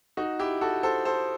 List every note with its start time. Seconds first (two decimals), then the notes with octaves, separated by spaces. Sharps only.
0.17 D#4 F#4
0.39 E4 G4
0.61 F#4 A4
0.83 A4 C5
1.05 A4 C5